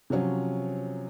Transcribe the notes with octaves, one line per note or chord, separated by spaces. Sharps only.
C3 F3 F#3 C#4